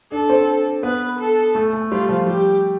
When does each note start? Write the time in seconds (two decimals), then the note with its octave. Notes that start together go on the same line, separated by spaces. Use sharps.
0.11 D4 A4
0.30 C4
0.83 B3 B4
1.19 A4
1.55 A3
1.73 A3
1.91 G3 F4
2.09 F3
2.26 G3 G4